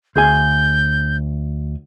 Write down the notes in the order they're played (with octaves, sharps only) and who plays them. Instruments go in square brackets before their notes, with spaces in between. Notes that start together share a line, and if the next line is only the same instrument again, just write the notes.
[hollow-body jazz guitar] D2 G#4 G#5 [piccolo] G6